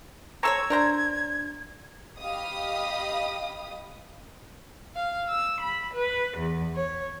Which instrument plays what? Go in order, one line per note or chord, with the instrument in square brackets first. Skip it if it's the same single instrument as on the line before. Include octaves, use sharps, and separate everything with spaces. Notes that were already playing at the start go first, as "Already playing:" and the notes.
[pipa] C4 A4 C#5 [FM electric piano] A#5 C#6 E6 [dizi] G#6
[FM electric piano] D4 [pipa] A#4 C5 A#5
[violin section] G4 D#5 F5 B5 D#6
[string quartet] F5
E6
B5
B4
E2
C#5